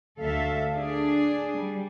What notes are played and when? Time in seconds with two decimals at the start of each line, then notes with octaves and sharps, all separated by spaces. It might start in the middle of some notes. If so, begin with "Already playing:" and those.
0.20 D2 A4 E5 F5
0.77 D4 G#4
1.57 G3